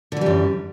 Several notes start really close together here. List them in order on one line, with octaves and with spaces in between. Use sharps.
D3 E3 G3 F#2